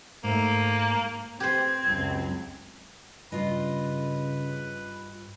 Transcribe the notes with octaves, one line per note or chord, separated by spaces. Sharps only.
G#2 A3 A#3
C4 G4 B4 C5 G#6
C#2 F#2
G2 C#3 F4 B4 D#5